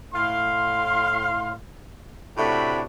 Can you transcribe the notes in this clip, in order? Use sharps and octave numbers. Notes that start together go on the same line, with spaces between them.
A2 F5 C6
A2 C3 A3 D4 F#4 B5